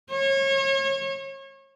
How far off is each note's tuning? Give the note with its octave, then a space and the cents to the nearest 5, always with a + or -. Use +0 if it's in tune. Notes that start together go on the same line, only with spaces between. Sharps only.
C#5 -30